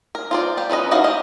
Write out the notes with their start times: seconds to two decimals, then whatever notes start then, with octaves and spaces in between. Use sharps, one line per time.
0.15 A#4
0.31 F4 C5 D5
0.57 G3 G4
0.70 F3 C#4 B4 D#5
0.91 D#4 E4 F#4 D#5 F5
1.04 G4 D#5